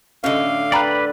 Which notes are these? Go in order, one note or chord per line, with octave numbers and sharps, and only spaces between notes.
A2 D3 C#4 F#4 D#5 F5
B4 D5 G5 A#5 B5